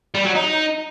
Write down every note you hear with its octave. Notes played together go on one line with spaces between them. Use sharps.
G3
F#3
D#4